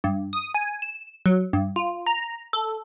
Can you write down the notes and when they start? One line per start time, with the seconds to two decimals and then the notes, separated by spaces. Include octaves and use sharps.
0.04 G2
0.33 D#6
0.54 G#5
0.82 E7
1.26 F#3
1.53 G2
1.76 F4
2.06 A#5
2.53 A4